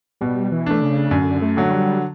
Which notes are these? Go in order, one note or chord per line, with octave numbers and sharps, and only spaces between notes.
B2 G3
E3
A3 D4
C#3
F#2 D3
A3
D3 F#3
G3